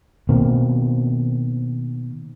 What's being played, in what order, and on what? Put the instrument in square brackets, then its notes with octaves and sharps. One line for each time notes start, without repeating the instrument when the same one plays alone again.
[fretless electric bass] B2 D#3 A#3 C4